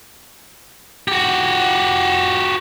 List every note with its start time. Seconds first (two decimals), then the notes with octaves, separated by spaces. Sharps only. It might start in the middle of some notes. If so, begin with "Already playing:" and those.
1.08 F#4 G4